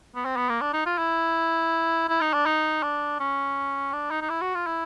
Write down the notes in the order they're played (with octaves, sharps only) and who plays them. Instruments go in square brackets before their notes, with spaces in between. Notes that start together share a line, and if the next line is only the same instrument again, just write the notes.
[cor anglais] B3
C4
B3
A#3
D4
D#4
F4
E4
E4
D#4
D4
D#4
D4
C#4
D4
D#4
D#4
E4
F#4
F4
E4